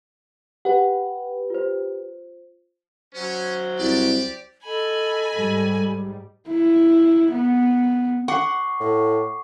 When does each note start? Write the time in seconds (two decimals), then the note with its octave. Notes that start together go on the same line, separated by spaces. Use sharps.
0.65 G4 B4 F#5
1.50 F4 C5
3.15 F#3 C#4 C5
3.79 C2 G4 D5
4.63 A4 D#5 G#5 B5
5.32 G#2 G3
6.48 E4
7.31 B3
8.28 F#5 C#6 D6 C7
8.80 A2